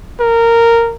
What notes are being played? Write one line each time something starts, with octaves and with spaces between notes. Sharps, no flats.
A#4